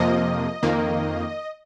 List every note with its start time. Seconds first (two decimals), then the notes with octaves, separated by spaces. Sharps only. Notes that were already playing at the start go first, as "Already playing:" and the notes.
Already playing: F2 C3 F3 A#3 D#5
0.63 F2 D#3 A#3